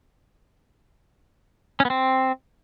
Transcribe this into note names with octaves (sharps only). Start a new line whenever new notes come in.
C#4
B3
C4